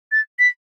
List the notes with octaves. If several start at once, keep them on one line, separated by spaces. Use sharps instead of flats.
A6
B6